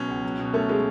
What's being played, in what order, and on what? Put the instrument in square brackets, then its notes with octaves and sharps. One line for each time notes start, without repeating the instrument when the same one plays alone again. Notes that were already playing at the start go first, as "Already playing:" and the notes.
Already playing: [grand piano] B2 F#3 C#4
C#2
F#3
B2
[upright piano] A3 [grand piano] C#4
[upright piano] G#3